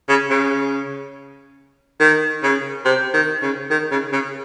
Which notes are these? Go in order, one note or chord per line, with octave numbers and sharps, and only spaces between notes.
C#3
C#3
D#3
C#3
C3
D#3
C#3
D#3
C#3
C#3